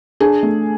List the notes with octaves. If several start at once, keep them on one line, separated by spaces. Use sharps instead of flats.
D4 G#4
A3